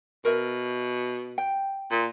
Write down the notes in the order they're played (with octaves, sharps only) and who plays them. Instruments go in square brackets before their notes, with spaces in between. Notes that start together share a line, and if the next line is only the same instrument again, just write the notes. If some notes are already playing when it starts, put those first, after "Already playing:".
[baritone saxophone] B2 [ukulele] A#4 E5
[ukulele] G5
[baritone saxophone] A#2